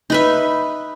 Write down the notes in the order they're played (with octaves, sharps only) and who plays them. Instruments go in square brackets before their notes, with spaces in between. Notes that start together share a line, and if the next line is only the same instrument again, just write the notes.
[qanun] D#4 B4 E5